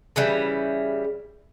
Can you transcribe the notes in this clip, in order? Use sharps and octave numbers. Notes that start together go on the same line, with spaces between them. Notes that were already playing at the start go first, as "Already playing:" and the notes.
C#3 E3 G3